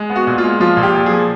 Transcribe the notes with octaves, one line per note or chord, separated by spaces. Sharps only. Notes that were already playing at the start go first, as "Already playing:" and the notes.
Already playing: G#3
B3
F#4
A#2
F4
G#3
F3 F4
A#2
G4
A#2
F3 G#4